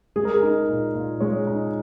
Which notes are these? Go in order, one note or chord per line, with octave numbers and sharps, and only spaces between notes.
G#3 G#4
A#4
G#4
D#4
A#2
A#2
G#3 C#5
D#4